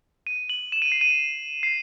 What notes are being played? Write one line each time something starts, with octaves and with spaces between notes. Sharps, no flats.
D#7
F#7
E7
D#7
C7
D#7
C7